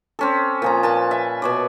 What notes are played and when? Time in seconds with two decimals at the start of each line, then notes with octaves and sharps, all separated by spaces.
0.19 C4 C#4 A4
0.62 A#2 F3 A#5
0.83 A#2 B4 A5
1.11 E5
1.42 B2 C#5 D5